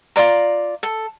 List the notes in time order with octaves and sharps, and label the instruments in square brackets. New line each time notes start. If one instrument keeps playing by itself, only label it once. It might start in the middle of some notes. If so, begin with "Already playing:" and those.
[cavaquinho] F4 A4 D5 A#5
A4